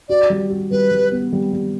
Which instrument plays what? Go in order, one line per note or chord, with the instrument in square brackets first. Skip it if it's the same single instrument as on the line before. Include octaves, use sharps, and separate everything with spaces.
[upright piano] F#4 [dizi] D5
[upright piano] G3
F#4
[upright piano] G3 [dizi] B4
[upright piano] G3
B3
G3
G3